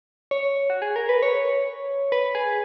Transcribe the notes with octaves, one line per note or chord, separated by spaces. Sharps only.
C#5
F#4
G#4
A#4
B4
C#5
B4
G#4